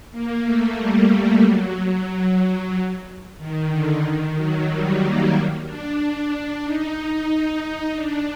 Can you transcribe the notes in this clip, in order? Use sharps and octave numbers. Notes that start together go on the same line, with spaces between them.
A#3
A3
G3
F#3
D#3
D3
D#3
F#3
G3
A#3
D4
D4
D4
D#4
D4